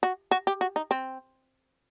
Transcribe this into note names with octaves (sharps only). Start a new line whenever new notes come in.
F#4
F#4
G4
F#4
D#4
C4